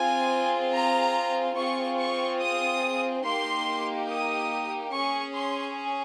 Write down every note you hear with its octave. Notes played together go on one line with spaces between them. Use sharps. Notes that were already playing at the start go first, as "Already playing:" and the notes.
Already playing: C4 F4 G#4 G#5
A#5
C4 F4 G#4 C#6
C#6
D#6
A#3 D#4 G4 C6
D#6
C#4 G#4 C#6
C6